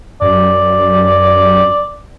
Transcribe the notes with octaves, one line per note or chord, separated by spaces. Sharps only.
F#2 D5